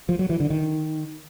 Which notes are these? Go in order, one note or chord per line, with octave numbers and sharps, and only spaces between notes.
F3
F#3
E3
D3
D#3